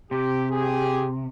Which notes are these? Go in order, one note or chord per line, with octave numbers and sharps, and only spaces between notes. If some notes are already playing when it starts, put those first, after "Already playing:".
C3 G4
G4 G#4